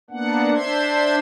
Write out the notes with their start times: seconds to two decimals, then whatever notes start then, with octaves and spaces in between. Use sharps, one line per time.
0.10 A#3 B3 D4 F#5
0.54 D4 C5 E5 C6 G#6